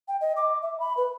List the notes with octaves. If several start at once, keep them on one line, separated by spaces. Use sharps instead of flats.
G5
D#5
D6
E5
B5
B4